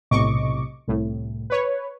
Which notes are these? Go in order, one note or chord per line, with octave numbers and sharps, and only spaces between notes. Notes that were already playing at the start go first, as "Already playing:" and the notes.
B1 A2 C3 D#5 C#6 D6
C2 A2
B4 C#5